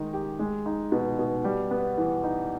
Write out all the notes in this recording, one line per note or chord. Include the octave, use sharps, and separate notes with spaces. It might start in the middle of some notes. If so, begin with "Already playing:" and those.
Already playing: D#3 G#3 D#4
G4
G#3
D#4
B2
B2
G3
B3
E3
D#4